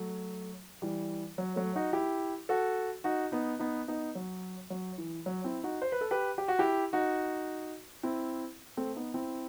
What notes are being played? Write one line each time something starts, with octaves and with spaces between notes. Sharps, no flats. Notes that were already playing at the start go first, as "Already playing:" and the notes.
Already playing: F#3 A3
E3 G3
F#3
F#3 A3
D#4 F#4
E4 G4
F#4 A4
D#4 F#4
B3 D#4
B3 D#4
B3 D#4
F#3
F#3
E3
F#3
C4 E4
D#4 F#4
C5
B4
A4
G4 B4
G4
F#4
E4 G4
D#4 F#4
C4 E4
A3 C4
B3 D#4
C4 E4